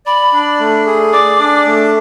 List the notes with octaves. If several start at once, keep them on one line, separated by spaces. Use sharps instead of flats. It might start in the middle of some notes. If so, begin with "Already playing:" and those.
D5 B5
D4
A3
G#4
D5 D6
D4
A3